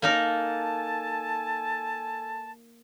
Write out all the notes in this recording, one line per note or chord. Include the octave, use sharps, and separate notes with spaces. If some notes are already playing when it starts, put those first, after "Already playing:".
A#3 D#4 A4 A#4 G#5 A5